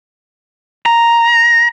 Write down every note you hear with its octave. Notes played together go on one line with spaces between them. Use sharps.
A#5